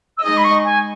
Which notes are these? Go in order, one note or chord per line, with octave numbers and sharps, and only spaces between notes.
E6
G#3 D#4 G#4 D#5 D#6
B5
C#6
G#5